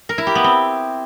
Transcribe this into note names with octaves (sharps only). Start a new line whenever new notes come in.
A#4
E4
G4
B3
C4